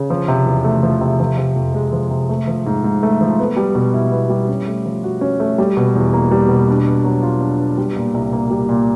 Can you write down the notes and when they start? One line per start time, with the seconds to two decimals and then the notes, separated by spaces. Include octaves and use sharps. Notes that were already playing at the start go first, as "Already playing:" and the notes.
Already playing: C#3
0.10 F3
0.28 C3
0.46 E2
0.64 A3
0.83 F3
1.01 C3
1.20 F3
1.38 C3
1.56 F2
1.74 G#3
1.93 F3
2.10 C3
2.29 A3
2.48 F3
2.66 G#2
2.84 G#2
3.03 A3
3.21 F3
3.39 B3
3.56 G3
3.75 B2
3.94 E4
4.12 B3
4.30 G3
4.49 C#4
4.67 A3
4.86 F3
5.03 F#4
5.21 C#4
5.40 A3
5.58 G3
5.77 B2
5.95 E2
6.13 A#3
6.31 G3
6.49 B2
6.68 D4
6.86 B3
7.04 F#3
7.23 F4
7.41 D4
7.59 B3
7.78 G3
7.96 A#2
8.14 C2
8.32 A#3
8.51 G3
8.69 A#2